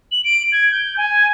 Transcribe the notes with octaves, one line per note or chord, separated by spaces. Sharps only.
F#7
D7
G#6
G6
G#5